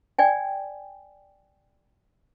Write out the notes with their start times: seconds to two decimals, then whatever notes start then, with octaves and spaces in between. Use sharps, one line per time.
0.19 D5 G5 G#5